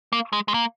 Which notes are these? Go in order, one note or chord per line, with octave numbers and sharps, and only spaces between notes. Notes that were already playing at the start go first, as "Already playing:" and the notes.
A#3
G#3
G#3
A#3